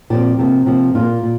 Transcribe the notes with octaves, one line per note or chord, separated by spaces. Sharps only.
A#2 F3 C4 G4
C3 F3 A#3
C3 F3 A#3
A#2 A#3 F4
A#2